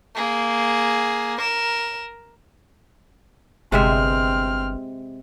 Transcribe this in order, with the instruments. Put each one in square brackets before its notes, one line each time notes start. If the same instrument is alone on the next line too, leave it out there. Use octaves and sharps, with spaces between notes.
[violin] A#3 G#4
A#4 E7
[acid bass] G1 [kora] C3 G#3 E5 [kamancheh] C4 F6